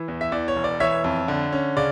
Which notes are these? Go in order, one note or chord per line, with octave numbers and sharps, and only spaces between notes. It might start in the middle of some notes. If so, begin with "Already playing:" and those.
Already playing: E3
E2
E5
E2 D5
C#5
E1
D5
E3 C#5 E5
F2
D3
C#4
C#3 D5